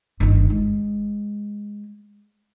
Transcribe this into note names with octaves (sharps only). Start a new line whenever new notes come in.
G1 D#3
G#3